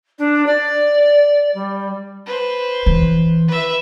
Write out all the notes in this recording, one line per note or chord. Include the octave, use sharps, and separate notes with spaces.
D4
D5
G3
B4 C5
E3
B4 E5